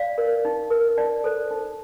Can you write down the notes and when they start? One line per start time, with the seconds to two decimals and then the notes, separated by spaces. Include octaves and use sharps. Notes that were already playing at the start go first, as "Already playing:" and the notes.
Already playing: D5 F5
0.18 A#4
0.45 D#4
0.70 A#4
0.97 D#4 D5
1.24 A4 C5
1.51 D#4